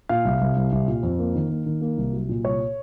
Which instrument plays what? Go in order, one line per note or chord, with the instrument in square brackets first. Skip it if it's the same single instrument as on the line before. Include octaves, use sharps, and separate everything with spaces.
[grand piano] A#2 F5
C2
C2
C2
C2
A#2
F2
A#3
D#3
A#3
D#3
A#3
C2
F#3
A#2
C2 C#5